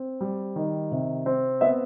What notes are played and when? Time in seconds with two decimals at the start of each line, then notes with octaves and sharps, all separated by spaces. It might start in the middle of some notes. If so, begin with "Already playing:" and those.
Already playing: C4
0.21 G3
0.56 D#3
0.91 C3
1.26 C4
1.61 B3 E5